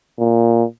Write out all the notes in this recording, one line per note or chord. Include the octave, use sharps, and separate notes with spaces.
A#2